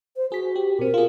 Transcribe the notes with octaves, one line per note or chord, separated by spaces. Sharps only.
C5
F#4 G#4 B6
G4
B2 C4 A#4
F4 G#4